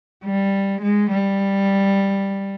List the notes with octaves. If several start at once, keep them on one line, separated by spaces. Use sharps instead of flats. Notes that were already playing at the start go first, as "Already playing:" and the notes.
G3
G#3
G3